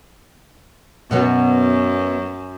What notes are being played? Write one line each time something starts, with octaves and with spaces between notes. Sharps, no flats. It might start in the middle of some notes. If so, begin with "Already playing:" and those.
F#2 B2 F#3 B3